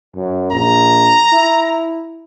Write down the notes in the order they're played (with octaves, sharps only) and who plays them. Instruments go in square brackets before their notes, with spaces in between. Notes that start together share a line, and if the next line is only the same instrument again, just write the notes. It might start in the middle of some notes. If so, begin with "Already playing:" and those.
[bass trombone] F#2
[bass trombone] A#1 [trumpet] A#5
[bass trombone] E4